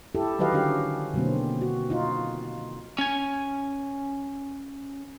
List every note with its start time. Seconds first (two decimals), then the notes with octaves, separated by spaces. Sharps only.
0.15 E4 G4 A4
0.39 D#3 F#3 G4 B4 D#5 F5
0.53 D3 C#4 F#4 G4 F5
1.14 B2 D3 F#3 A#3 C4
1.61 F#4
1.90 D#4 F4
2.98 C#4 G#5